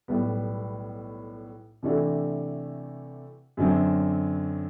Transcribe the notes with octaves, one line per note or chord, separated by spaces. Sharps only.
B1 A2 G3 B3
C3 E3 A3 D4 F#4
F#2 D3 F#3 C4